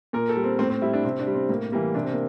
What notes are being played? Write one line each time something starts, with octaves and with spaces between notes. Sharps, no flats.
A#2 A#4
A4
G3
C4
A2 C4
C4
G3 E4
D4
C3 C4
D4
G3
C4
A2 A#3
E3 G3 A#3
C3 D4
C4
A#3